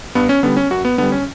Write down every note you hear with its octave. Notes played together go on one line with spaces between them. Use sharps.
G2 B3
C#4
D3 G3 B3
C#4
F#2 F#4
B3
D3 G3 B3
C#4